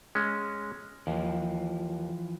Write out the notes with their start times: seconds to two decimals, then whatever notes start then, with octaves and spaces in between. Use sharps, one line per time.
0.15 G#3 C#4
1.07 D#2 E3 F3